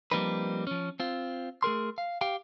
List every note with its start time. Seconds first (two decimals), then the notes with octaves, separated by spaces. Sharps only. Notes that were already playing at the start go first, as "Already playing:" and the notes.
0.11 F3 G3 A#3 C4 D#4 B4
0.67 F3 C#4
1.00 C4 F4
1.63 A3 G#4 A#4 C6
1.98 F5
2.21 G4 F5 G5